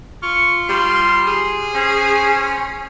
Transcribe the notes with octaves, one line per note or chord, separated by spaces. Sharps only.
F4 C#6
G3 C6
G#4
C#4 C5